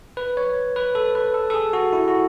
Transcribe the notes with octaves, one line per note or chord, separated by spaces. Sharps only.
B4
C#5
B4
A4
B4
A4
A4
G#4
F#4
E4
F#4